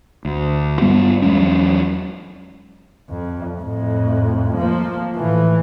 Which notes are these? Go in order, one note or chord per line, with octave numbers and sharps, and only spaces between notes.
D2
G2 G3 B3
E2 F#3 G#3 C#4
F2
F2 A2
F3 A#3
A2 E3